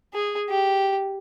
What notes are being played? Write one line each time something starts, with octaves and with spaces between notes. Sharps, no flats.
G#4
G4